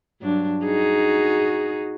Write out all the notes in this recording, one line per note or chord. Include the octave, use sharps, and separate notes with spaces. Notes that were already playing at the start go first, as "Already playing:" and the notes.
G2 F#3 D4
D#4 F#4 G#4